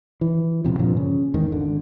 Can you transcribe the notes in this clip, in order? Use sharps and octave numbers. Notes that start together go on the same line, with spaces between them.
E3
E1 C#2 C3 F3
G2 A#2 D3 F3
C#3
E2 G#2 D#3
G#1 D3